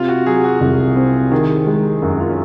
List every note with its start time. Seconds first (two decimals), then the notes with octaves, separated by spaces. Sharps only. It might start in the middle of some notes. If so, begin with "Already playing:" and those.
Already playing: C3 F4
0.08 F#4
0.26 F#3 G#4
0.44 F#4
0.61 C2
0.96 C4
1.32 D#3 G#4
1.67 G#3
2.02 F#2 F#4
2.20 F4
2.29 C#4